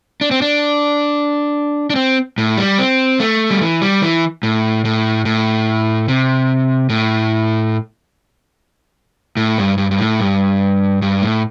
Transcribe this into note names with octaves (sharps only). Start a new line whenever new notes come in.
D4
C4
D4
D4
C4
A2
G3
C4
A3
G3
E3
G3
E3
A2
A2
A2
C3
A2
A2
G2
G2
G2
A2
G2
G2
A2